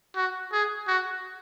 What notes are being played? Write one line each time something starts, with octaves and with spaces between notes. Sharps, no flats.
F#4
G#4
F#4